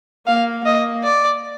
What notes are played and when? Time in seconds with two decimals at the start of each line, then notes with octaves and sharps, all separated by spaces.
0.27 A#3 F5
0.65 A#3 D#5
1.04 D5